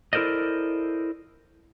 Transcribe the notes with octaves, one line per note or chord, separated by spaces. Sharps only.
E4 A4 A#4 C5 D5 D#5